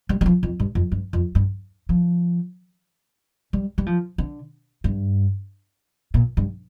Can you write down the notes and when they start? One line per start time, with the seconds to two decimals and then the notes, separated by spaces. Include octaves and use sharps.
0.09 G3
0.21 G3
0.26 F3
0.43 F2
0.60 G2
0.75 F2
0.92 G2
1.13 F2
1.35 G2
1.89 F3
3.53 G3
3.78 G3
3.86 F3
4.18 D3
4.84 G2
6.14 A#2
6.37 G2